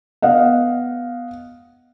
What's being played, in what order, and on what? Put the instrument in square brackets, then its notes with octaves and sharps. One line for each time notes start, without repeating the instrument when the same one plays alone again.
[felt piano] B3 D#5 F5 F#5